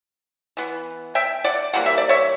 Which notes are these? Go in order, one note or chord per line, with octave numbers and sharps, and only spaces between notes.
E3 B3
E5 G5
D5 F#5
E3 G3 A#3 F#5
E5
D5
C#5 E5